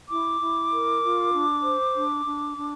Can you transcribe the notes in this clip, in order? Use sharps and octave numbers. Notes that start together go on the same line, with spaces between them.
E4 D6
E4
A#4
F4
D4
C5
D4
D4
D4